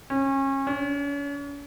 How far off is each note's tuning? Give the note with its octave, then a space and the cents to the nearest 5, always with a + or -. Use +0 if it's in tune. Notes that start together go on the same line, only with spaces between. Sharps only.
C#4 -30
C#4 +40